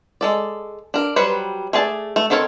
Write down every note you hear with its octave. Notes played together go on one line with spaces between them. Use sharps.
G#3 A4 D5
D4 A#4
F#3 G3 B4 C5
A3 G#4 D5 A5
A3
D#3 C4 A4 A#4 C#5